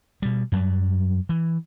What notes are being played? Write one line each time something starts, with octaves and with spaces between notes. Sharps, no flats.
B2 G3
F#2 F#3 G3
E3